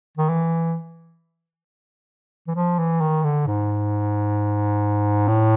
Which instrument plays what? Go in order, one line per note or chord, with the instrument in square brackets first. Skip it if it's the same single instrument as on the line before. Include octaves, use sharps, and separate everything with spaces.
[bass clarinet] D#3
E3
E3
F3
E3
D#3
D3
G#2
A2